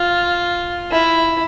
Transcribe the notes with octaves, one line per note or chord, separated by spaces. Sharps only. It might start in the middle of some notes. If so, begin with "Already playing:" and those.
Already playing: F4
E4